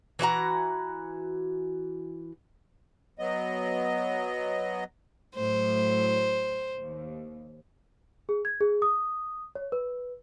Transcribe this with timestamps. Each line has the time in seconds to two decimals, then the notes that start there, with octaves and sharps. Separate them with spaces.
0.19 E3 F#4 F#5 A#5
3.19 F#3 B3 D#5
5.35 A2 F#3 C5
6.78 D#2
8.29 G#4
8.45 G#6
8.61 G#4
8.82 D#6
9.55 C#5
9.72 B4